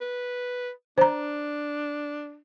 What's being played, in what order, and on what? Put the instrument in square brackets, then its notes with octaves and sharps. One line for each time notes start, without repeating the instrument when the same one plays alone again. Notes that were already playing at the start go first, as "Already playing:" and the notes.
[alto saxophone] B4
[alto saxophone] D4 [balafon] C5 A#5